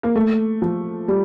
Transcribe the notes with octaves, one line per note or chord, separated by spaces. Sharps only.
A#3
A3
F3
G3